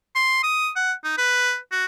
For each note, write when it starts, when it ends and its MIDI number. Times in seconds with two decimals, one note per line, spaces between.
0.15 0.41 84
0.43 0.70 87
0.76 0.93 78
1.04 1.15 63
1.18 1.57 71
1.72 1.86 66